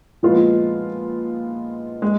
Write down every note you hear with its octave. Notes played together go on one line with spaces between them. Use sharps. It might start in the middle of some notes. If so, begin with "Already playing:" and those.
A#2 F3 G#3 B3 F4
G#3